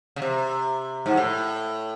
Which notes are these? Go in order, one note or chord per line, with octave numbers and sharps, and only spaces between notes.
C#3
C3
G#2
A2